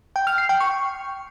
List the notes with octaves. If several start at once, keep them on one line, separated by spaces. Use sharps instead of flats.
G5
F6
C7
G5
C#6